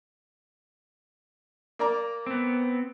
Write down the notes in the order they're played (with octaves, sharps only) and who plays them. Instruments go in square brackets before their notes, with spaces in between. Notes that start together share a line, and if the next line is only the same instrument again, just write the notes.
[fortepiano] A#3 D5 A#5
[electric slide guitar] B3 C4